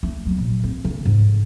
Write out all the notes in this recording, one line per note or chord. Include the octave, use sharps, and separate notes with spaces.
A3
F#3 B3
A#2
C4
D3
G#2